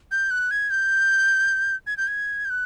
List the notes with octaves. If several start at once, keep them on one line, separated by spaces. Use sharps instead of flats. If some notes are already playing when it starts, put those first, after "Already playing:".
G6
F#6
G#6
G6
G#6
G6
G#6
G6
F#6